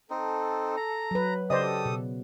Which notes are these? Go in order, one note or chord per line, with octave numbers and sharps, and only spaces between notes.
C4 D#4 A4
A#5
F#3 B4
C#3 G4 A4 C5 D5 D#5 D#6
B2